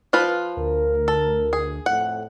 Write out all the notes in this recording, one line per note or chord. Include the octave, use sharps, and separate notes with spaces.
F3 F4 B4
D2 A#4
A4
G#4
F2 A2 F#5